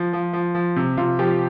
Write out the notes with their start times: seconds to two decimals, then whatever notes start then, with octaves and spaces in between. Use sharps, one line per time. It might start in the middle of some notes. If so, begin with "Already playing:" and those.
Already playing: F3
0.13 F3
0.33 F3
0.55 F3
0.76 C3
0.97 C3 F4
1.19 F3 G4